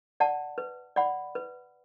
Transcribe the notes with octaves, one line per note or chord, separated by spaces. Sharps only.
D5 F#5 A5
B4
D5 F#5 B5
B4